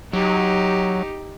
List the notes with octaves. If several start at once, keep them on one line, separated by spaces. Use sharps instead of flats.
F#3 D#4 G4